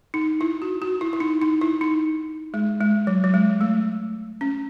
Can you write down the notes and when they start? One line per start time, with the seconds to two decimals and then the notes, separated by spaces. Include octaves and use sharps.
0.14 D#4
0.41 E4
0.62 F#4
0.82 F#4
1.01 E4
1.13 E4
1.20 D#4
1.42 D#4
1.61 E4
1.81 D#4
2.54 G#3
2.81 G#3
3.07 F#3
3.24 F#3
3.34 G#3
3.61 A3
4.41 C#4